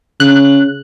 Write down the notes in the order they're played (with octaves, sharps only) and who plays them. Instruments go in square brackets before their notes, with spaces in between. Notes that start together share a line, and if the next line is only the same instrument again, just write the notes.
[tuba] C#3 [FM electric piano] F#6